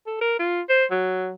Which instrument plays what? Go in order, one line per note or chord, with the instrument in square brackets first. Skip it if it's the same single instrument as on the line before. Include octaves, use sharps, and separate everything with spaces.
[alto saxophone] A4
A#4
F4
C5
F#3